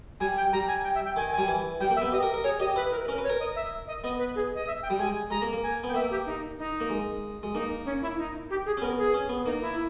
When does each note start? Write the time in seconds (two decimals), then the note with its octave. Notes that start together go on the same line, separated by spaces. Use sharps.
0.20 G3 G#5
0.37 G5
0.53 G3 A#5
0.68 G#5
0.84 G5
0.95 E5
1.05 G5
1.16 D#3 G#5
1.33 G#5
1.38 G3
1.48 E3
1.80 G3 G5
1.91 A#3
1.96 E5
2.02 B3
2.12 G4 D#5
2.23 A#4
2.34 A#4
2.44 G#4 C#5
2.60 G4 D#5
2.76 E4 B4
2.91 A#4
3.03 B4
3.08 C#4 A#4
3.18 B4
3.24 C#5
3.30 A#4
3.40 D#5
3.56 E5
3.88 D#5
4.04 B3 D#5
4.19 B4
4.35 G#4
4.55 D#5
4.67 E5
4.83 G5
4.90 G3
4.99 G#3 G#5
5.30 G#3 A#5
5.42 A#3
5.53 A#3
5.63 G#5
5.84 B3 G5
5.94 A#3 E5
6.11 G4
6.26 D#4
6.59 D#4
6.80 A#3
6.90 G#3
7.43 G#3
7.54 A#3 D#4
7.86 C#4
8.02 E4
8.18 D#4
8.50 G4
8.66 G#4
8.77 C#4
8.82 B3 A#4
8.98 G#4
9.14 C#4
9.29 B3
9.46 A#3 D#4
9.62 E4